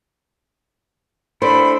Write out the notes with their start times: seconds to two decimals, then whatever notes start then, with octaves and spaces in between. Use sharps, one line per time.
1.42 A3 D4 E4 C5 B5